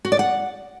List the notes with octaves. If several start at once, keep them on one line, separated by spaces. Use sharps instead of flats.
F#4
D5
F#5